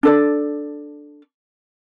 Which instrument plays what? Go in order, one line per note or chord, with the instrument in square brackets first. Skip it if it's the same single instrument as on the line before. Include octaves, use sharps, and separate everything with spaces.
[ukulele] D4 A4 D5